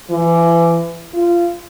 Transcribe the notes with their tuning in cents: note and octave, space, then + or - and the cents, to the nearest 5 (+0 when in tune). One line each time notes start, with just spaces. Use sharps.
E3 +30
F4 -20